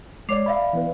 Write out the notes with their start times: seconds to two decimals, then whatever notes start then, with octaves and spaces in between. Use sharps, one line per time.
0.29 G#3 C#5 D5 D6 C7 F7
0.46 D5 E5 F5 B5
0.73 E3 B3 B4